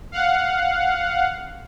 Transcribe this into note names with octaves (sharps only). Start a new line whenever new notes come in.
F5 F#5